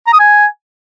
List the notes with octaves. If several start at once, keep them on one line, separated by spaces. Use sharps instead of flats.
A#5
D#6
G#5